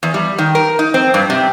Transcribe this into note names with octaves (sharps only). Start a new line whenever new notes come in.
E2
G3
D#3
A#4
D#4
C4
G2
C3